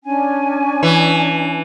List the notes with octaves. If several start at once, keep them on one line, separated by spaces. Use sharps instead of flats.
C#4 D4 G#5
E3